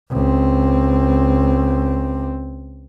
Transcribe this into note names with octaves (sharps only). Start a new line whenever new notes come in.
C#2 C4